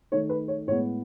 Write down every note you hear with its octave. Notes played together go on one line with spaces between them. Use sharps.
D#3 A3 C#5
B4
C#5
A2 G#3 B3 C#5